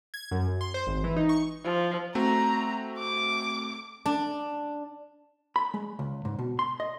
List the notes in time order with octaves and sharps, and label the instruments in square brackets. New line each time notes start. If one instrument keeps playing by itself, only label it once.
[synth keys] G#6
F#2
F#2
C6
C5
G#1
E3
D#4
C#6
[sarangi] F3
[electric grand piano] A3 C4 F#4 [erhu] A#5
[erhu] D6
[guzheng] D4
[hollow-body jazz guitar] B5
G#3
C#2
G#2
B2
C6
D#5